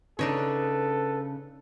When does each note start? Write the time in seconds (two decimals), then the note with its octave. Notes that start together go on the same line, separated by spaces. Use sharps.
0.19 C#3 D4 D#4 A4 B4 C#5